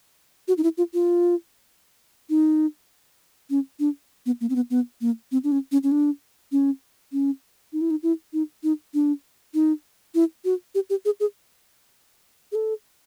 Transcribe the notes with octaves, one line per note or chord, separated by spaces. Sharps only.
F#4
D#4
E4
F4
F4
D#4
C#4
D4
B3
A#3
C4
B3
B3
A#3
C4
D4
C#4
C#4
C#4
D4
C#4
C#4
D#4
E4
D#4
E4
D#4
D#4
D4
D#4
E4
F#4
G4
G4
G#4
G#4
G#4
A4